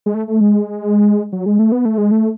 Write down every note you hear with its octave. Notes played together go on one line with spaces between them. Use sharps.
G#3
A3
A3
G#3
F#3
G#3
A3
B3
A3
G#3
A3